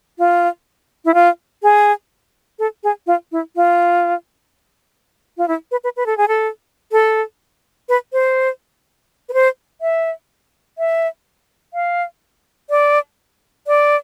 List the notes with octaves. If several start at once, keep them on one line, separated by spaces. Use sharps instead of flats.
F4
E4
F4
G#4
A4
G#4
F4
E4
F4
F4
E4
B4
B4
B4
A4
G#4
A4
A4
B4
C5
B4
C5
E5
E5
F5
D5
D5